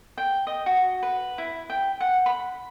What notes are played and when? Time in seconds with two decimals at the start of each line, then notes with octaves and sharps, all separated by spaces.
0.18 G5
0.47 D#5
0.66 F#4
1.03 B4
1.38 E4
1.70 G5
2.00 F#5
2.26 B5